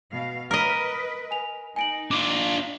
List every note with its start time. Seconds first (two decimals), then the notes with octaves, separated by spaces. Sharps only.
0.12 B2 F5
0.51 A#4 B4 D#5 F6
1.31 G#5 F7
1.76 D#4 G#5 D7 F#7
2.11 D4 F4 D6